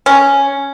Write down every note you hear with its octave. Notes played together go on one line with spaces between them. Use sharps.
C#4